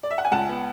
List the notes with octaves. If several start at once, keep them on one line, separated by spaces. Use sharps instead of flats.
D5
E5
F#5
G#5
C#2 F#5 A5
B3